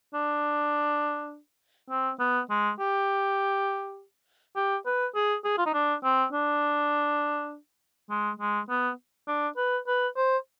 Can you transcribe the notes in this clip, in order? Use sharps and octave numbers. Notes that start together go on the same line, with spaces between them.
D4
C4
B3
G#3
G4
G4
B4
G#4
G#4
F4
D#4
D4
C4
D4
G#3
G#3
B3
D4
B4
B4
C5